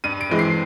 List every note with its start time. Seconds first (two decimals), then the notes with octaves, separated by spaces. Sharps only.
0.04 G2 D#7
0.21 D7
0.30 E3 G#3 C4
0.39 C7